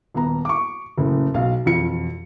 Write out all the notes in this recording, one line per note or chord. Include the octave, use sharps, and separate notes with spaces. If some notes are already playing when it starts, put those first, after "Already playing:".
D#1 B3 A#5
C#6 D6
F#1 A2 C#3
B1 F5
E1 F2 F4 C#7